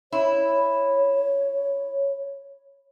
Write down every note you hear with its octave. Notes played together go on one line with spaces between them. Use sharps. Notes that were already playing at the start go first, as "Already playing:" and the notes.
E4 C#5